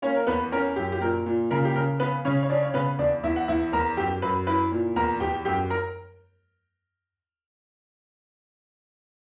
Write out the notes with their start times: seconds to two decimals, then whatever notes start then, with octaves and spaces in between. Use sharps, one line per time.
0.02 A#3 C#4 C#5
0.16 A#4
0.27 E2 B3 B4
0.52 C#4 A#4
0.76 F#2 G4
0.92 G4
1.01 A#2 A#4
1.26 A#2
1.51 C#3 A#4
1.65 G4
1.76 C#3 A#4
2.00 B3 B4
2.25 C#3 C#4 C#5
2.43 C#5
2.49 C#4 D4 D5
2.63 C#5
2.74 C#3 B3 B4
2.99 E2 D4 D5
3.23 E2 E4 E5
3.36 F#5
3.48 E2 E4 E5
3.72 E2 A#4 A#5
3.97 F#2 G4 G5
4.22 F#2 B4 B5
4.47 E4 B4 B5
4.72 A#2
4.96 E2 A#4 A#5
5.20 E2 G4 G5
5.45 F#2 G4 G5
5.70 A#4 A#5